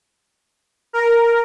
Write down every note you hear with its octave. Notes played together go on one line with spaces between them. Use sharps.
A#4